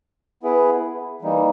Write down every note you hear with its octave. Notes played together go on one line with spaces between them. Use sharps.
B3 E4 G#4 B4
E3 G3 A#3 D#4